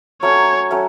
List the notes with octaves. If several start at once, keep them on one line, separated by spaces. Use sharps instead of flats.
F#3 A3 C#4 C#5
F#3 A3 C#4